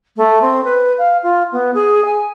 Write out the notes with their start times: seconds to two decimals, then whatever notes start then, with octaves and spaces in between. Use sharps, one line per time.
0.16 A3
0.41 C4
0.64 B4
0.98 F5
1.23 F4
1.52 B3
1.74 G#4
2.05 G#5